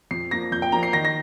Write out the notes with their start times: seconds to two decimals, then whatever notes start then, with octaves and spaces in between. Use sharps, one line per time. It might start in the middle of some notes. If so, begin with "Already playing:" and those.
0.11 F2 C7
0.31 F3 A#3 A#6
0.52 F2 G6
0.62 G5
0.72 F3 A#3 A#5
0.83 C7
0.93 D#3 A#6
1.05 A#6